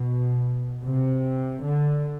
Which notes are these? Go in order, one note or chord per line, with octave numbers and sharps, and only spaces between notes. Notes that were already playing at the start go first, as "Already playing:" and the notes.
Already playing: B2
C3
D3